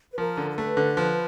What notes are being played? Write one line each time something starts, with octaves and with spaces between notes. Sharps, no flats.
B4
F3 A#4
D3
A#4
A3 B4
D3
F3